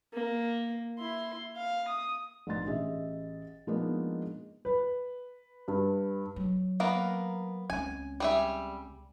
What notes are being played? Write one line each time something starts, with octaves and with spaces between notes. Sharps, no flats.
A#3
E4 C6
F5
D#6
A#1 G#2 B2 D#4 C6 A6
A1 G#4 D#5 E5
F3 G#3 A#3 B3 D4 D#4
B4
G2
F#3
A#3 B3 A#4
C#2 C4 G#5
G3 G#4 E5